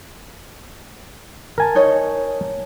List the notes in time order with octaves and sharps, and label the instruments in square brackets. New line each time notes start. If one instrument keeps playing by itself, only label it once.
[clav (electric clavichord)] A#4 G#5 A5
[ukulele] D#4 C#5 D#5